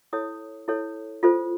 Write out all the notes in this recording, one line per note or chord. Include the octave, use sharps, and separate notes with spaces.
E4 A4 C#5 D#6
E4 A4 C#5
F4 A4 C5